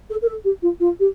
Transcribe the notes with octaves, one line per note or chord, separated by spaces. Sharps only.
A4
A#4
A4
G4
F4
F4
G4